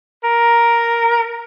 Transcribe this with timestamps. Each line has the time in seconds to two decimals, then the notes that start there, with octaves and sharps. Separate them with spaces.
0.24 A#4